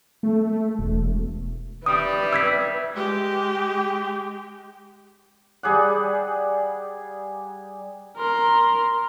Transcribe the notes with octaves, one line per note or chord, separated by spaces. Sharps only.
A3
A3
E1
G3 B4 E5 D#6
E6 G#6 B6
G#3 G4
G3 G#4 D5 F#5
A#4 C6